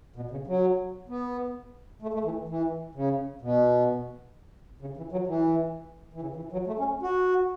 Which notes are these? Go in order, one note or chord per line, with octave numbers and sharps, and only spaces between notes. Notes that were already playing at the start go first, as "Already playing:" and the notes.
B2
C#3
F#3
B3
A3
A3
E3
E3
C#3
B2
C#3
E3
F#3
E3
E3
C#3
E3
F#3
A3
C#4
F#4